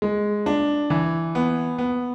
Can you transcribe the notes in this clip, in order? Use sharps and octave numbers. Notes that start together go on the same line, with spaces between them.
G#3
D4
E3
B3
B3